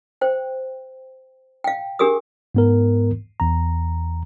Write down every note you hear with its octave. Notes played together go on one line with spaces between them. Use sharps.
C5 G5
F5 G5
D4 G4 G#4 A#4 D#6
G#2 B3 A#4
E2 A#5